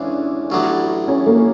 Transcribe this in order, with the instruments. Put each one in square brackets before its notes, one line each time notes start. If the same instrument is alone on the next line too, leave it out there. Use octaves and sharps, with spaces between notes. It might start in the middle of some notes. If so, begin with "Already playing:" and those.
Already playing: [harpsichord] E2 C#3 E3 G#3 [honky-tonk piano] C#4 D4
[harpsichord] A1 A2 F#3 B3 D4
[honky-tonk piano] C#4
A#3